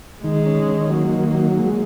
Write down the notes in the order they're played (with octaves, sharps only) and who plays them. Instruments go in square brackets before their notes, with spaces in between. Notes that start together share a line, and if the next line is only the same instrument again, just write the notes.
[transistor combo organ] D#3 [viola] G#3
[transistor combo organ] C#4
D#3
[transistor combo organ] F#3 [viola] A#3
[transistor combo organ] D#3
F#3
G#3